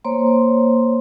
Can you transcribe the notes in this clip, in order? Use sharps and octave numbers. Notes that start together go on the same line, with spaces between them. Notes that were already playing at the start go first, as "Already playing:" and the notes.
A#3 C5 C#5 A#5 C6